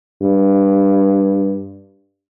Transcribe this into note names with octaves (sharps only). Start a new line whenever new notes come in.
G2